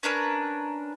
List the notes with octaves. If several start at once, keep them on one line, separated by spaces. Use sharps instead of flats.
C#4 D4 A#4 B4